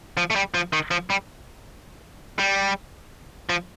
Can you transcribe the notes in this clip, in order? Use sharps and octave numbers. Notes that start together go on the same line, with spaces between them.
F3
A3
G3
F3
D#3
F3
G3
G3
F3